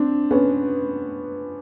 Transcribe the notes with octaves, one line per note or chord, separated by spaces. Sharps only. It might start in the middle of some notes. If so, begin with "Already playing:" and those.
Already playing: C4 D4
B3 C#4